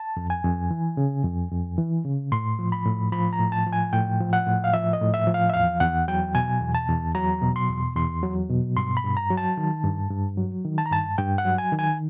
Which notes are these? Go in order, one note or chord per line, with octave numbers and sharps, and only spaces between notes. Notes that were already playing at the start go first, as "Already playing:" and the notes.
Already playing: A5
F2
G#5
F2
E3
C#3
F2
F2
E3
C#3
A2 C6
F3
B5
A2
F3 B5
A#5
A2
A5
F3
G#5
A2 G5
F3
F#5
A2
F5
F3 E5
D#5
A2
E5
F3
F5
E5
E2 F5
E2 F#5
F#3 G5
B2 G#5
E2
A5
E2
F#3 A#5
B2
C6
E2
E2 C6
F#3
B2
G2 C6
B5
G2
A#5
F#3
A5
D#3
G2
G2
F#3
D#3
A5
A#5
G2 A5
G2 G5
F#5
F#3
G#5
D#3
G#5